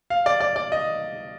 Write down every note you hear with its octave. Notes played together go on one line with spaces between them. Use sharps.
F5
D5
D5
D5
D#5